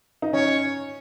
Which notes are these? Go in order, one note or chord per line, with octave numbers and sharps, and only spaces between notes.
D#4
C#4 C#5